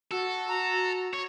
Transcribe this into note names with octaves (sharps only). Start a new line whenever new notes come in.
F#4 A4
A#5
C#5